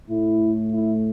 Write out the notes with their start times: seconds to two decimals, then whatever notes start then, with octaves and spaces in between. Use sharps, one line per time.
0.09 A2 A3 E4
0.70 E4